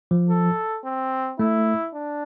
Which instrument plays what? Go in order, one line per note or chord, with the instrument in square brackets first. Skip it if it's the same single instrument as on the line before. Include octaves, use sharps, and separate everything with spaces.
[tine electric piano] F3
[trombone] A4
C4
[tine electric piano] A3 [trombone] E4
[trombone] D4